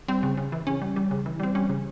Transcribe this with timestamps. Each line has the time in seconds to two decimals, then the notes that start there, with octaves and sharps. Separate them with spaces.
0.08 G3 C4
0.23 C#3
0.38 C#3
0.52 E3
0.67 C#3 C#4
0.82 G3
0.96 G3
1.11 C#3
1.26 E3
1.40 G3 C4
1.55 G3 C#4
1.69 C#3